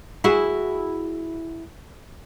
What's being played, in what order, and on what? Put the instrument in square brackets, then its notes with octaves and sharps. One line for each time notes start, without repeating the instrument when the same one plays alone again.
[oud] E4 F#4 G#4